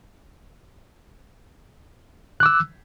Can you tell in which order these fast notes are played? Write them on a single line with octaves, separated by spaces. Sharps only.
F#6 D6 E6